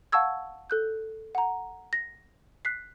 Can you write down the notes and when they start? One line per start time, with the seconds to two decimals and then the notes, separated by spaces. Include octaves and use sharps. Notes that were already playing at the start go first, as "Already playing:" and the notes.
0.12 F5 F#5 A5 C#6 E6 G#6
0.70 A4 F#6 G6
1.35 F#5 A#5
1.93 A#6
2.65 F#6 B6 C7